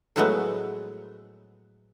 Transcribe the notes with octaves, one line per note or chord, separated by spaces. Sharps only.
A2 F3 F#3 G#3 A3 B3